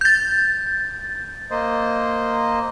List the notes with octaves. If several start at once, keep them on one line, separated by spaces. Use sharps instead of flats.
G6 A6
A#3 C5 D#5